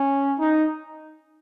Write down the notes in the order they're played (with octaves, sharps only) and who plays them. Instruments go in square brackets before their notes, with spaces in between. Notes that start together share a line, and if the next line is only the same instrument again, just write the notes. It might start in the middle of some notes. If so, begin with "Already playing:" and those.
Already playing: [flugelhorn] C#4
D#4